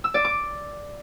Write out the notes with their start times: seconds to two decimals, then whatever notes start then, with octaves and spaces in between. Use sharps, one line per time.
0.04 E6
0.14 D5
0.25 D6